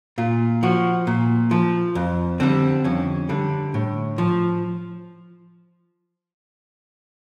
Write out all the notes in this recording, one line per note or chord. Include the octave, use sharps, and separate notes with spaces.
A#2 F4
F3 F#4
A#2
F3
F2
D3 G3 C4
F2 C#4
D3 G3
A2
F3